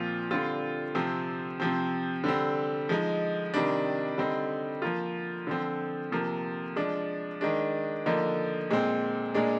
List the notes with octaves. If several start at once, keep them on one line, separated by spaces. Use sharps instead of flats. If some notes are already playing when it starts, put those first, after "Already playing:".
Already playing: A#2 F3 C4 F4
D3 G3 C4 F4
C3 F3 C4
C3 F3 C4
D3 G3 C4
F3 G#3 D#4
C3 D#3 G3 D4
D3 G3 C4 D#4
F3 A#3 F4
D3 F3 C4
C3 F3 A#3
F3 G#3 D4
D#3 G#3 D4
D3 F3 A#3 D#4
A#2 G#3 C4
A#2 G#3 D4